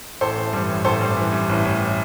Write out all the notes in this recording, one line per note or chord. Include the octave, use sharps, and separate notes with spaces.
A1 A4 C5
E3
G2
A1
A1 A4 C5
G2
E3
G2
A1
A1